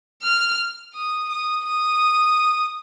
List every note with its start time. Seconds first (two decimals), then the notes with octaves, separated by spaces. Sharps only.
0.22 F6
0.94 D#6
1.29 D#6
1.65 D#6